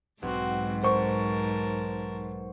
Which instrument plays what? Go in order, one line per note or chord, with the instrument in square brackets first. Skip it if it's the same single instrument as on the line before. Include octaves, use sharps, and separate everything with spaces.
[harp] B1 [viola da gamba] G#2 [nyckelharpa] C4 F#4
[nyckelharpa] A#4 A5 [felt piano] C5 C#6